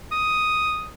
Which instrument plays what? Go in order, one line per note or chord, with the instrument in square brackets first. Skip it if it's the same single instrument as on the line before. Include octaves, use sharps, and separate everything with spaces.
[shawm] D#6